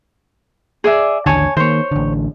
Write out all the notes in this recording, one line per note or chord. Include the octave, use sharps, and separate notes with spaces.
G#4 D5 E5
A1 D#2 D3 C#5 G#5 A5
D#3 A#3 C5 C#5
A1 D3